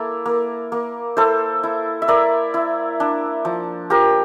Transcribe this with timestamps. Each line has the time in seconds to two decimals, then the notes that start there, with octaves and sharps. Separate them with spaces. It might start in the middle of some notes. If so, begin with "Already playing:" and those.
Already playing: A#3 E4 A4
0.26 A#3
0.72 A#3
1.17 E4 A4 C5
1.63 E4
2.02 E5
2.08 E4 A#4 D5
2.54 E4
3.00 D4
3.45 F3
3.90 F3 G4 A#4